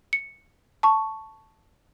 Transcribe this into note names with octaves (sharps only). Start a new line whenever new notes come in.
C#7
A5 C#6